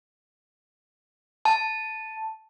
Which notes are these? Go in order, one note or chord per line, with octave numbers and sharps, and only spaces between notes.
A5